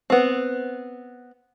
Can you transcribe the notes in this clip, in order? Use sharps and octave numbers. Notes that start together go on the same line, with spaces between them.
B3 C4